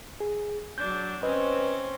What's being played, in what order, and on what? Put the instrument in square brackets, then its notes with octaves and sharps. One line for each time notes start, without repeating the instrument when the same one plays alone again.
[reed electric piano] G#4
[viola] F#3 D4 [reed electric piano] G6
[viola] C4 C#4 [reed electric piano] B4 D#5